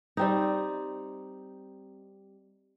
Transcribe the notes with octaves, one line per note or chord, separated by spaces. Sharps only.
G3 C4 D#4